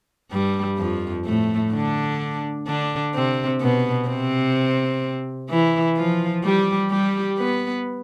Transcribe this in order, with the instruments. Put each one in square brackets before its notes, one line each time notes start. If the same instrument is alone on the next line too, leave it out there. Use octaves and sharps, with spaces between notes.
[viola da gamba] G2 G3
F2 F3
A2 A3
D3 D4
D3 D4
C3 C4
B2 B3
C3 C4
E3 E4
F3 F4
G3 G4
G3 G4
B3 B4